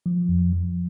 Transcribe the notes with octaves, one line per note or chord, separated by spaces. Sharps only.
F3
F2
F3